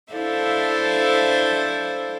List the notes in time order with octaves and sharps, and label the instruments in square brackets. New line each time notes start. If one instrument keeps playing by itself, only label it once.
[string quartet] D4 E4 A4 C5 E5 F5